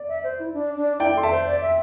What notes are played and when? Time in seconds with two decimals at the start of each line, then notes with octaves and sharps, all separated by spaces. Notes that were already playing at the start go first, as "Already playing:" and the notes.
Already playing: D5
0.08 E5
0.24 C5
0.39 E4
0.54 D4
0.77 D4
1.00 E4 D5 G5
1.16 A4 C6
1.23 E5 A5
1.31 C5
1.46 D5
1.61 E5